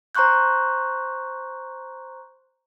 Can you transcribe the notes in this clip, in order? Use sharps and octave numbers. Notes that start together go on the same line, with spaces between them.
C5 A#5 C6 C#6 F#6 G6